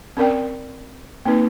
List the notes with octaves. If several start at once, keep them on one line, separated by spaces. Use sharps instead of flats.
C4 C#4 A#4 D5 G5
A#3 C4 D#4 B4